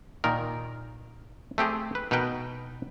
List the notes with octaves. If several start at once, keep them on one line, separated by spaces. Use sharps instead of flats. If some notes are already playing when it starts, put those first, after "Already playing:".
A#2 D#3 A#4
A3 C4 G4 G#4
B4
B2 D#4 A#4 B4 G5